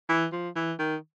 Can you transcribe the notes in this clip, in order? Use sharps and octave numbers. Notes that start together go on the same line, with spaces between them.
E3
F3
E3
D#3